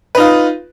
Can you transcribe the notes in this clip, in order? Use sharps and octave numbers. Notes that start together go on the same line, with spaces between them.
D#4 F4 B4